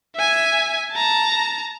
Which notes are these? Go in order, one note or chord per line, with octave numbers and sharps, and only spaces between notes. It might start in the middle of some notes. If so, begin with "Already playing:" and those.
E5 G#5
A5 A#5